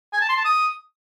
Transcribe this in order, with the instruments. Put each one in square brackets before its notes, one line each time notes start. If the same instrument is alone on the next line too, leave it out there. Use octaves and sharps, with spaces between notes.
[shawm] G#5
A5
C6
A5
D#6